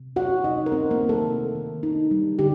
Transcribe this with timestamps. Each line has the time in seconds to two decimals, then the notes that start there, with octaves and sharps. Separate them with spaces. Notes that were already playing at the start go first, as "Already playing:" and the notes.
Already playing: C3
0.16 A3 F#4 F#5
0.44 C3 D#4 D#5
0.66 A#4
0.72 A3 C4 C5
0.91 A#3 A#4
1.00 D#3
1.09 A3 A4
1.27 C3
1.55 D#3
1.83 D#4
2.11 G3
2.39 D3 G4